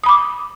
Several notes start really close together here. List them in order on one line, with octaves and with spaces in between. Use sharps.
D#6 B5 D6